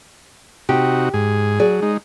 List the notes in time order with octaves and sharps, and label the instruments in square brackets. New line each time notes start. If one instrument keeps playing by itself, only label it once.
[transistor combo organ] C3 D#4 F#4 [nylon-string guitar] G4
[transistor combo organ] G#2 G#4
[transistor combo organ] F#3 [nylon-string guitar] G#4 D5
[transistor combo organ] G#3 D#4